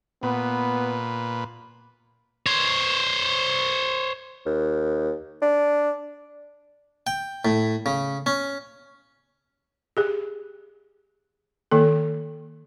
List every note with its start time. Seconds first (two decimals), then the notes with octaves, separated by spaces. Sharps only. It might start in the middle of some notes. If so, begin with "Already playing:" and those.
0.23 A#2 B3 B4
2.46 C5 C#5
4.46 D#2
5.42 D4
7.07 G5
7.45 A2
7.86 C#3
8.26 C#4
9.97 G4 G#4
11.71 D#3 A#3 A4